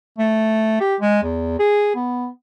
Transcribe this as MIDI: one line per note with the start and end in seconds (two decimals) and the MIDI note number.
0.18 0.78 57
0.80 0.95 67
1.00 1.22 56
1.23 1.57 40
1.59 1.93 68
1.95 2.28 59